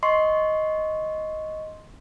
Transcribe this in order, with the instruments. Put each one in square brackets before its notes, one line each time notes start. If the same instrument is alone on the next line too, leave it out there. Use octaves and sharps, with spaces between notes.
[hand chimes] D#5 C6 C#6 C7